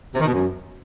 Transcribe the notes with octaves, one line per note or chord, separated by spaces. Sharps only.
C3
D#3
B2
F#2